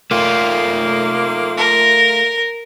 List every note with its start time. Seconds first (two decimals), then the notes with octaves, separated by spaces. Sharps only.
0.11 A3 A#3 F4
1.57 A#4